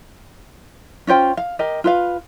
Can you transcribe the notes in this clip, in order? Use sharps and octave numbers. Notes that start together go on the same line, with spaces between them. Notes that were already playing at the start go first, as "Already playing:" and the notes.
C#4 F4 C5 G5
F5
G4 A#4 D#5
F4 B4 F5